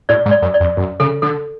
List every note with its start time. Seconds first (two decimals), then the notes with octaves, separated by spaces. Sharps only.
0.09 A2 D5
0.26 G#2
0.31 D5
0.42 F#2
0.54 D5
0.60 F2
0.77 F#2
1.00 C#3 A4
1.22 D3 A4